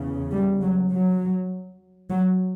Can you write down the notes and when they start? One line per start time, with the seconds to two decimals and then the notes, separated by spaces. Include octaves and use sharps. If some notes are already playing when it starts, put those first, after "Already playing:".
Already playing: E2 C#3
0.31 G3
0.61 F#3
0.90 F#3
2.11 F#3